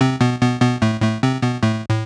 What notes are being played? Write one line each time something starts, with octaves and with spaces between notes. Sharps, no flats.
C3 C4
B2 B3
B2 B3
B2 B3
A2 A3
A2 A3
C3 C4
B2 B3
A2 A3
A2